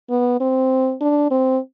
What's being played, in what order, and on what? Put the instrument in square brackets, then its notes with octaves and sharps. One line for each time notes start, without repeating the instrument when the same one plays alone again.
[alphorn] B3
C4
D4
C4